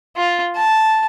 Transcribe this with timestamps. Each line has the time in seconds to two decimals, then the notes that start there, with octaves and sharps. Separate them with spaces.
0.17 F4
0.56 A5